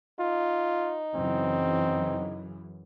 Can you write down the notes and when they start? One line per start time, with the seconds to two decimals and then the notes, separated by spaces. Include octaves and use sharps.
0.20 D#4 F4
1.15 F#2 C#3 E3 C4